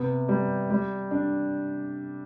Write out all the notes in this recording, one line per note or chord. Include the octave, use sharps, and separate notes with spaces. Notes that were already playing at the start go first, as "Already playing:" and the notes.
Already playing: C3 B3
G3
G3
D4